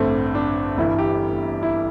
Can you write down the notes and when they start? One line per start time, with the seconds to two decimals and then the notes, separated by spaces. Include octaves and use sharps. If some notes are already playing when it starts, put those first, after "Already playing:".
Already playing: A1 G2 D3 A3 C4
0.35 D4
0.77 G1 G2 E3 E4
0.98 G4
1.63 E4